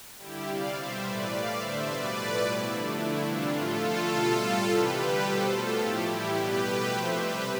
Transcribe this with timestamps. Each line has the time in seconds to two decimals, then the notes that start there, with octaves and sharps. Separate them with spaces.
0.18 D3 G3 E4 G4
0.45 C3 G3 D5 F5
0.74 B2 G3 C5 E5
1.02 A2 E3 A3 B4 D5
1.29 A2 G3 D5 F5
1.58 D3 A3 C5 E5
1.86 B2 G3 B4 D5
2.14 A2 F3 A3
2.41 B2 G3 E4
2.70 D3 F3 A3 D4
2.97 D3 A3 E4
3.26 C3 E3 G3 D4 F4
3.53 A2 F3 A3 F4 A4
3.81 D3 A3
4.10 B2 G3
4.37 A2 G3
4.66 C3 E3 G3 G4 B4
4.94 D3 G3
5.22 B2 G3 A4 C5
5.50 B2 A3 F4 A4
5.78 A2 F3 A3 E4 G4
6.06 A2 E3 G3 E4 G4
6.34 B2 G3 G4 B4
6.63 B2 A3
6.90 C3 F3 A3 C5 E5
7.18 C3 G3 G4 B4